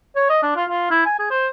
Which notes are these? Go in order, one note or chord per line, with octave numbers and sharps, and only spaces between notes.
C#5
D#5
D4
F4
F4
E4
G#5
G#4
C5